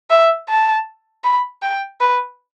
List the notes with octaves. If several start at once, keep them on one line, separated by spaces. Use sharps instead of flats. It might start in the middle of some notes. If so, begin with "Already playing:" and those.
E5
A5
B5
G5
B4